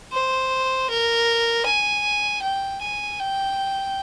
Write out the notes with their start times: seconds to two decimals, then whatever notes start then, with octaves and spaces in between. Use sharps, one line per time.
0.13 C5
0.90 A#4
1.66 G#5
2.42 G5
2.82 G#5
3.20 G5